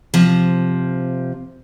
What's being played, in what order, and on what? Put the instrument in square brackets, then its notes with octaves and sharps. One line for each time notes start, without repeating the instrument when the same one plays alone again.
[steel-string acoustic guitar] C3 F3